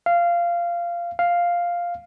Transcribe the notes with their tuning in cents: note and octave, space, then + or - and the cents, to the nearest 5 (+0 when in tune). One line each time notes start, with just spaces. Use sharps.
F5 -15
F5 +0